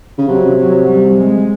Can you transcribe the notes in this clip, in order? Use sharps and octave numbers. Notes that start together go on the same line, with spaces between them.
C#3
C3 F#3
F#3
G3
G#3